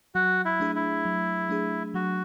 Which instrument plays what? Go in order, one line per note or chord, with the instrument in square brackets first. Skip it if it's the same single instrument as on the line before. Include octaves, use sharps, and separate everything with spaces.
[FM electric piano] F#3 [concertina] F#4
[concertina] E4
[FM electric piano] A3 D4 G#4
[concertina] E4
[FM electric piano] F#3
A3 D4 G#4
[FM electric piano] F#3 [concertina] F#4